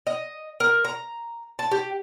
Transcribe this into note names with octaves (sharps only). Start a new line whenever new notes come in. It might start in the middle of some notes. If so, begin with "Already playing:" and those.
D#5
A#4
A#5
A5
G4